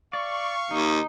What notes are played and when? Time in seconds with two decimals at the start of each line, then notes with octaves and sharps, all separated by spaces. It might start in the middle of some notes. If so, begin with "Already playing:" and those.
0.13 D5 F5 C#6
0.71 D#2 D#4